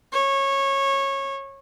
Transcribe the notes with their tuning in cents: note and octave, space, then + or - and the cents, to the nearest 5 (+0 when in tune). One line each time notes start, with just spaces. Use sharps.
C#5 -20